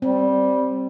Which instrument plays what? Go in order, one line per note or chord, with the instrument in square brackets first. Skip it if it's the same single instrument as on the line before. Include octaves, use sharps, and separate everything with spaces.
[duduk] G3 [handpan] C4